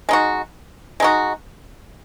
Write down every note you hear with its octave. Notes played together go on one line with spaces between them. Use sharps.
G#3 D#4 F#4
G#3 D#4 F#4